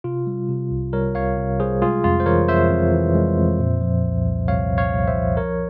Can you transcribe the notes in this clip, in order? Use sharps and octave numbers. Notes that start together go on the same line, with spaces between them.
C3 F4
G3
C3
C2
G3 A#4 C#5
C2 C#5 F5
C3
G3 G#4 C5
G#3 F4 G#4
F2 F4
C5
E3 A#4 C#5
F2 C5 E5
F2
E3
G#3
F2
A#2
F3
C2
C2
C2 C#5 F5
C2
C#5 F5
C2
C5 E5
F3
F3 A#4 C#5